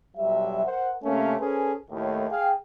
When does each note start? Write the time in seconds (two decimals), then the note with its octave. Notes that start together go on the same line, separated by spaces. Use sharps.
0.16 B1 F#3 G3 E5
0.65 A#4 C5 F#5
1.03 C3 A3 A#3 C#4
1.39 C#4 G#4 A4 B4 C5
1.91 D#2 A2
2.29 G#4 F5 G5